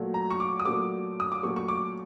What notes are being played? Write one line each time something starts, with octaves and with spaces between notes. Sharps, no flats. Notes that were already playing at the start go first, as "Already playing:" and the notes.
Already playing: A#2 F#3 A3
A#5
C#6
D6
D#6
A#2 F#3 A3 D6
D#6
D6
A#2 F#3 A3 C#6
C#6
D6